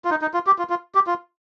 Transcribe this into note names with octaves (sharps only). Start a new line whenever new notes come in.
F4
D#4
D#4
F4
G4
F4
F4
G4
F4